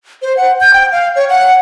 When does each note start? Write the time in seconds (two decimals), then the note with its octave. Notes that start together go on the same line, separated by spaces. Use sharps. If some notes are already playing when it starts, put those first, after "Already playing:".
0.22 C5
0.37 F#5
0.61 G6
0.74 G5
0.92 F5
1.16 C#5
1.29 F#5